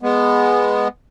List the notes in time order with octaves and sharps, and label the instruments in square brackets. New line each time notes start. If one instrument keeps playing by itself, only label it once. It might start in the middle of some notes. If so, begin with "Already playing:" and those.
[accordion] G#3 B3